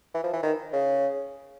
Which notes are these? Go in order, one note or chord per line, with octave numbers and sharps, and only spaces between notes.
E3
F3
E3
D#3
C#3